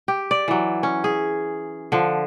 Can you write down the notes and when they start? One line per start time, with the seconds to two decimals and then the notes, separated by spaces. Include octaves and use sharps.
0.08 G4
0.31 D5
0.48 E3 F#3
0.83 C#4
1.04 G#4
1.92 D3 F3